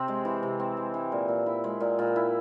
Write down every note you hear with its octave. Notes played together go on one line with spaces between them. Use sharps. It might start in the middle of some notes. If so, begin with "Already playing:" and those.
Already playing: C3 C4
G#3
E3
C3
C4
G#3
E3
A#2
A#2
E4
G#3
A#2
A#2
E4